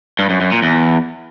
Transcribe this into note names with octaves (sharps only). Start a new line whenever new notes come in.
G2
F#2
F#2
A#2
E2